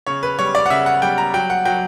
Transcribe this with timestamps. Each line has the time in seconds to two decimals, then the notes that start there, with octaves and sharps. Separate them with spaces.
0.07 C#3 C#5
0.23 B4
0.39 G3 C#5
0.55 D5
0.66 F#5
0.70 C#3 E5
0.86 F#5
1.02 G3 G5
1.18 A#5
1.34 F#3 G5
1.50 F#5
1.65 F#3 G5